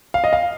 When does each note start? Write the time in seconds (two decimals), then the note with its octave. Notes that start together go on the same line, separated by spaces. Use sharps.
0.14 F5
0.24 D#5
0.33 F5